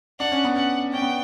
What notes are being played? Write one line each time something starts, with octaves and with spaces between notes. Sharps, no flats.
D4 F#5
C#4
B3
C#4 F#5
C#4 G5
B3